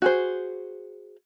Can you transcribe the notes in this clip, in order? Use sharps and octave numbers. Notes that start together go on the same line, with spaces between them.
F#4 G#4 C5